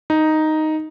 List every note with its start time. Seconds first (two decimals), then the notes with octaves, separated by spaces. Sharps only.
0.10 D#4